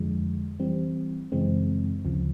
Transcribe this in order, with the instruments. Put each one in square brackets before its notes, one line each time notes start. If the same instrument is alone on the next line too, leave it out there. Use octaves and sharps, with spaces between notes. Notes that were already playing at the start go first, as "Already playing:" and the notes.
Already playing: [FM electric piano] F2 D3 F3 G#3
E3 G3 C4
F#2 C#3 E3 G#3 C4
D2 C#3 F3